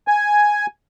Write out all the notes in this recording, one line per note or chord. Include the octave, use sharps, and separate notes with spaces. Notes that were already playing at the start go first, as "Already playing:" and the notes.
G#5